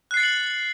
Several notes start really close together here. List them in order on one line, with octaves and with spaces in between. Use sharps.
F#6 C7 A6 C#7 F#7